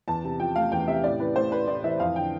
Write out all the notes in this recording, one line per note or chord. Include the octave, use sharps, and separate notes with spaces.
E2 A5
C3
F3 G5
A3 F5
E2 G5
C3 E5
A2 D5
E3 B4
A3 C5
A2 B4
A2 D5
E3 E5
F2 F5
D3 G5